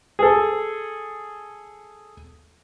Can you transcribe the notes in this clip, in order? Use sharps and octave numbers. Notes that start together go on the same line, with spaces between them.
G#4 A4